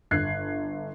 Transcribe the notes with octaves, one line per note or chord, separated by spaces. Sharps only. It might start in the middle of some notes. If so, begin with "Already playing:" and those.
G1 F#6 G#6 C7